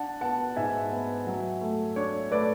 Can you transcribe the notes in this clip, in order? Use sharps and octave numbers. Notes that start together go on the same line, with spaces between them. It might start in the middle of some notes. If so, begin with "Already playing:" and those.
Already playing: D4 F#5 A5
B3 F#5 A5
G#2 E5 G#5
B3
F#3
A3
D4 C#5
A3 B4 D5